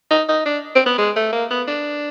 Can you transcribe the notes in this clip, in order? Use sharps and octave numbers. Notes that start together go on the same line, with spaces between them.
D#4
D#4
D4
C4
B3
G#3
A3
A#3
B3
D4